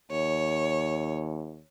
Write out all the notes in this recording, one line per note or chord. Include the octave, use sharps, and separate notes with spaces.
D#2 C#5